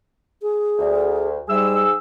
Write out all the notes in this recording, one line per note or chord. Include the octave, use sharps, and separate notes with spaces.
G#4
D2
G#2 G3 G#4 E6